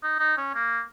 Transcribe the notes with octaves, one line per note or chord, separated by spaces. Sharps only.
D#4
D#4
C#4
A#3